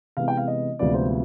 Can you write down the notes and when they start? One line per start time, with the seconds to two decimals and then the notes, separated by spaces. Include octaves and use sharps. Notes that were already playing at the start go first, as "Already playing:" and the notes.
0.17 C3 E3 G#3 B3 F5
0.28 G5
0.37 F5
0.48 D#5
0.79 D2 C3 F3 G#3 B3 D5
0.94 C5